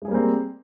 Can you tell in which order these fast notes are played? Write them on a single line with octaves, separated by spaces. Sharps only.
G#3 G#4 G3 A#3 C4